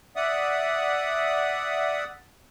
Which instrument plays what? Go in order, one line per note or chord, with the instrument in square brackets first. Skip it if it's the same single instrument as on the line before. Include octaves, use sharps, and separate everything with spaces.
[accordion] D5 E5 F#5 D#6